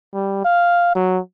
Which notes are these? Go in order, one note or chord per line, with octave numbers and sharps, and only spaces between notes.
G3
F5
F#3